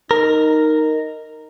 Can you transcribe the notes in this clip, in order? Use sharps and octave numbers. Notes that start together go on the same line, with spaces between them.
D#4 A#4